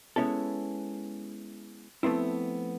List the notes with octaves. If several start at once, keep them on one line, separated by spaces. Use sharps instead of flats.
G#3 B3 C#4 E4 A4
F3 A3 B3 C4 E4